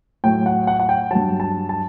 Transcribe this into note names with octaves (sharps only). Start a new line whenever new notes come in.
A2 F#3 G5
F#5
F#5
F#5
G5
G2 F#3 A5
A5
A5